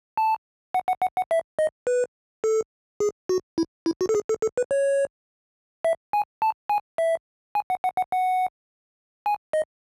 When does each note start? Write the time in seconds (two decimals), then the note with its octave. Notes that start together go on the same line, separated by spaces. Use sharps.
0.17 A5
0.74 F#5
0.88 F#5
1.02 F#5
1.17 F#5
1.31 E5
1.59 D#5
1.87 B4
2.44 A4
3.00 G#4
3.29 F#4
3.58 E4
3.86 E4
4.01 F#4
4.09 A4
4.15 G#4
4.29 A4
4.42 A4
4.57 B4
4.71 C#5
5.84 E5
6.13 G#5
6.42 A5
6.69 G#5
6.98 E5
7.55 G#5
7.70 F#5
7.84 F#5
7.97 F#5
8.12 F#5
9.26 G#5
9.53 D#5